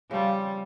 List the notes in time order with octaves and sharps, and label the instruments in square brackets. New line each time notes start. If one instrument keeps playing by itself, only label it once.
[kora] C#3 F3 C4 [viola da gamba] G3